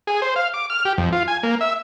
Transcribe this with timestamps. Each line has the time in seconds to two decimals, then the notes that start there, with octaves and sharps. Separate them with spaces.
0.07 G#4
0.22 C5
0.36 F5
0.54 D6
0.70 F6
0.85 G4
0.98 F2
1.13 F4
1.28 G#5
1.43 A#3
1.61 E5